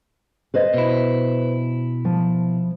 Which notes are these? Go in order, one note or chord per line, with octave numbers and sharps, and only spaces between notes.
B4 C5 D#5
B2 E4
F3